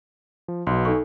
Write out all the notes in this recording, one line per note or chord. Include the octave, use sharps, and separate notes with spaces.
F3
B1 B2 C6
D#4 A4 C#6